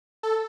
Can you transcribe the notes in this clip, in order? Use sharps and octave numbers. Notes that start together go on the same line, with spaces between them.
A4